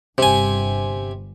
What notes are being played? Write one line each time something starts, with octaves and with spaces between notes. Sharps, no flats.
G1 G2 C3 G#5